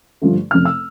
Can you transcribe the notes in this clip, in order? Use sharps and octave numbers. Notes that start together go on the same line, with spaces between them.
G2 D3 F3 A3
F1 F2 C#3 F6
E6